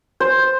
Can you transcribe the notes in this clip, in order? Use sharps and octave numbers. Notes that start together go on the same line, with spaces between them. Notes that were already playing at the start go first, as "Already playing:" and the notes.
C5